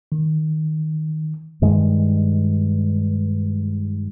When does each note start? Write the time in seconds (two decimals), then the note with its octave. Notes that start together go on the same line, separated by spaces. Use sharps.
0.12 D#3
1.62 G2 D#3 G#3